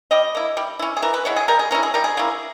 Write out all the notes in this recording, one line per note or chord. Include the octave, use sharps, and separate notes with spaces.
G3 D#5
A#3 E4
G3
C#4 E4
G#4
E3 A#4
B4
G#3 B3 E4 C#5
G#4
G3 A#4
G#4
C#4 E4 A#4
G#4
G3 A#4
G#4
A#3 C#4 E4